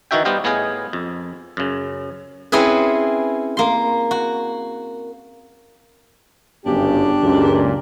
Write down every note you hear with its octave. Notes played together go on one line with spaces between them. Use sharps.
D#3 E3 D#4 F#4 E5 G5
G3 B3 G4 C5 D#5 F5
A2 B3 G#4 D#5 F5 G#5
F2
F#2 C#3
C4 C#4 E4 G#4 B4
A#3 C6
F#4
G1 F#2 C#3 B3 D4 G4
C#2 F#2 A#2